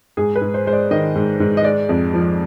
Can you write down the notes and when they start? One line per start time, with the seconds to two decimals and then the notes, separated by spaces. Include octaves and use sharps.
0.17 G#2 G#4
0.36 B4
0.41 G#2
0.54 C5
0.66 G#3 C5
0.73 D5
0.91 D#3 D#5
1.15 G#2
1.40 G#2
1.57 D#5
1.64 G#3 D5
1.89 F2
2.14 F3